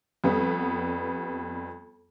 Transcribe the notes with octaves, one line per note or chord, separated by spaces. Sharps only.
F2 G3 B3